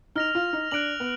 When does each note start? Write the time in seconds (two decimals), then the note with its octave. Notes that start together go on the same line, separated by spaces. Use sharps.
0.15 D#4 F6 A#6 F7
0.35 F4
0.53 D#4
0.71 D4 F#6 D7 F#7
1.00 B3